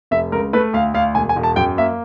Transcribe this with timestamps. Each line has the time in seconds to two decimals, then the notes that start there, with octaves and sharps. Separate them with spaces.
0.11 F1 E5
0.32 C#2 A#4
0.53 A3 B4
0.73 D2 F5
0.94 D2 F5
1.15 E1 G#5
1.29 G#5
1.36 E1
1.43 A5
1.56 F#2 G5
1.77 A#3 E5